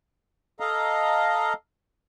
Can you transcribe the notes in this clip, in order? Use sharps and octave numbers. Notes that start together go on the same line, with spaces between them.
A4 D#5 F5 A#5